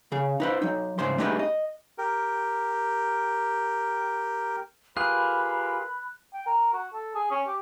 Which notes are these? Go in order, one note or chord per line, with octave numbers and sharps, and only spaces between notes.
C#3 G#4
D#4 B4 C5
F#3 D#4
C2 G#2 C#3 C5 C6
A3 D4 D#4 G4 G#4 B4
D#5
G4 A#4
F4 G4 G#4 A#4 B4 B5 F#6
G5
A#4
F#4
A4
G#4
C#4
G4